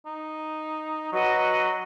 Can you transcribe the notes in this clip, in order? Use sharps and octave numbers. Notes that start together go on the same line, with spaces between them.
D#4
F#3 F#4 B4 D#5